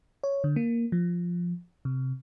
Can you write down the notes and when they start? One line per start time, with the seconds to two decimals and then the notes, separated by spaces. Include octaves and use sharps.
0.24 C#5
0.44 D3
0.56 A#3
0.92 F3
1.85 C3